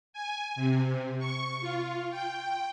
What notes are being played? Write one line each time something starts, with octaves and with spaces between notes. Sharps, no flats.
G#5
C3
C#6
F4
G5